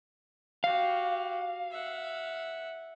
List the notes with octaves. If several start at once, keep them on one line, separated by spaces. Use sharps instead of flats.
F#4 G4 F5
E5 F#5